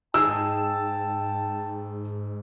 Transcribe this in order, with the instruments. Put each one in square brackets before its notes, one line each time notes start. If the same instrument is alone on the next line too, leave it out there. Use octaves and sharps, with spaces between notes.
[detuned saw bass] G#2 [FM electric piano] D#4 G#4 [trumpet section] G5 A5 [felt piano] E6